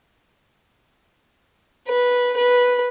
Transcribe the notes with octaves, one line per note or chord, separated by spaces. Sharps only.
B4
B4